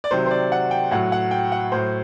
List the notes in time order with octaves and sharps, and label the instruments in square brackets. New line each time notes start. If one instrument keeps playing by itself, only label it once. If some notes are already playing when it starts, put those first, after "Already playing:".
[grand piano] D5
C3 D#3 F#3 C5
C5
D5
F#5
G5
A2 F#3 F#5
F#5
G5
F#5
A2 F#3 C5